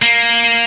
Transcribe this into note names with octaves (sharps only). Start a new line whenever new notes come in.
A#3